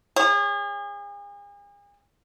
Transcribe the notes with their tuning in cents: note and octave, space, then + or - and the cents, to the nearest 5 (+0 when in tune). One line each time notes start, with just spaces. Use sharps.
G#4 -40 C#5 +0